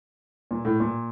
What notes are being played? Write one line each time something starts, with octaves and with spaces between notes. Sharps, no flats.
A#2
A2
A#2